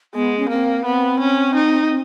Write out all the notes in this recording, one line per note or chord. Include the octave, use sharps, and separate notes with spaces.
G#3 B3
C#4
A#3 C4
B3 C4
C#4
D#4